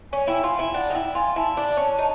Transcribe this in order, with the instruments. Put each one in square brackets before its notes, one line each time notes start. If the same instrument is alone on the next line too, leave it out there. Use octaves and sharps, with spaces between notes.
[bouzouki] C#4 [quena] G#5
[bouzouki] E4 [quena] G5
[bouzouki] F4 [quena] G#5
[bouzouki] E4 [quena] G5
[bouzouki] D4 [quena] F#5
[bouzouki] D#4
[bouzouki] E4 [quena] G5
[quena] G5
[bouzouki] F4 [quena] G#5
[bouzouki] E4 [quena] A5
[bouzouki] D4
C#4
D#4